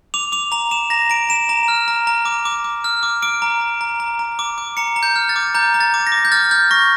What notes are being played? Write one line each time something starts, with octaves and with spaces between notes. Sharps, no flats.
D6 F7
D6 F7
A#5 F7
D6 E7
A#5 A#6
A#5 D7
A#5 E7
A#5
F6
A#5
A#5
D6
D6
D6
F6
D6
D6 D7
A#5
A#5
A#5
A#5
A#5
D6
D6
A#5 C#7
A#5
G6
F6
A6
D6
A#5 G6
A#5
A6
D6
A#6
D6
G6
F6 A6
F6 G6
C#6 A#6